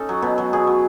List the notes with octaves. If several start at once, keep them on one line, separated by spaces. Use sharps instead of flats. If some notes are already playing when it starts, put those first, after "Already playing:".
Already playing: C#4 D#4 A4
F#3
B2
F#3
B2 G#4
F#3